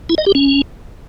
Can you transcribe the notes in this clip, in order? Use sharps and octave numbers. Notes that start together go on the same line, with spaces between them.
E4
D#5
G4
C#4